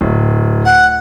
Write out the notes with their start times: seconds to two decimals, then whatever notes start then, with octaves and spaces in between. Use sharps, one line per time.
0.01 D1
0.65 F#5